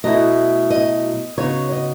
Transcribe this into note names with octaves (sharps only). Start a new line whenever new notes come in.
B2 F#3 A3 E4 D#5
D#5
C#3 F#3 B3 D#4 C#5
D#5